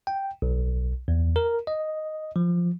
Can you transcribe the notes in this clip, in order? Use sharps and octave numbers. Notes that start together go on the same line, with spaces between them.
G5
B1
E2
A#4
D#5
F3